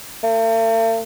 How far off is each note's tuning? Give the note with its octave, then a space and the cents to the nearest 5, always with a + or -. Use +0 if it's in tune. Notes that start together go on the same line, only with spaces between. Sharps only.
A3 +45